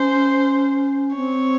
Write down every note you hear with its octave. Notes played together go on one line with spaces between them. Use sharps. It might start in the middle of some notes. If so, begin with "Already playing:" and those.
Already playing: C#4 C5
C4 C#5